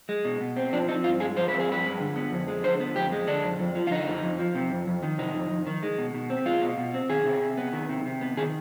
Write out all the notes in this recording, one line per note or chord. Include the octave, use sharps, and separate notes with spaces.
G#3
B2
B2
C4
F3 D4
C4 D#4
G2 F4
G#3 G#4
F3 C5
C4 B4
G#4
G2 B4
G#3
D3
B3
F2
G#3
D3 C5
B3
F2 G4
G#3
D3 D4
F2
F2
F3
F4
D3 D#4
F2
F2
F3
C3
F2
F2
D#3
C3 D#4
F2
F2
D#3
G#3
B2
B2
C4
G#3 F4
B2
B2
C4
D#3 G#4
C3
C3
B3
D#3
C3
C3
B3
D#3 G#4